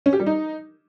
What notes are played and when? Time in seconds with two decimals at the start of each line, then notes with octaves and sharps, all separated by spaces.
0.06 C#4
0.13 G4
0.20 G3
0.26 D#4